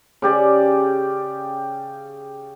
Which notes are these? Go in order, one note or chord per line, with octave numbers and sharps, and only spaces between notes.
C#3 G4 D5